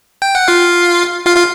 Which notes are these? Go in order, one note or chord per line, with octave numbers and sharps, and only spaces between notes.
G5
F#5
F4 F5
F4 F5
F4 F5